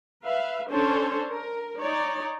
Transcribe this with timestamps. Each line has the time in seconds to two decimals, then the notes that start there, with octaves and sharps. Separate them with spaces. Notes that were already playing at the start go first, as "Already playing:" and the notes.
0.24 B4 E5 F5
0.69 C#4 D4 A4 C5 C#5
1.29 A#4
1.78 D#4 C#5 D5